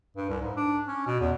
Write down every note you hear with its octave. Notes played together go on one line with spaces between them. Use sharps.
G2
C2
G#2
D4
C#4
B2
E2